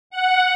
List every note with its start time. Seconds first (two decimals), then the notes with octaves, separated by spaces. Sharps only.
0.10 F#5